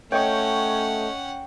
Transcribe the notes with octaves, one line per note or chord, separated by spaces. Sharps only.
A3 C#4 C#5 D#5 F#5 G5 C#6